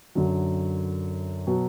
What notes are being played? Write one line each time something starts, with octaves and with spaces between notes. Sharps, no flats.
F#2 D3 F#3
B2 F#3